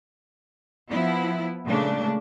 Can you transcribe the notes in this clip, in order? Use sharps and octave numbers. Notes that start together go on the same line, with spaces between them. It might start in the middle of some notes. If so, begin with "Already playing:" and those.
F3 B3 E4
A#2 C#3 G#3 A3 D4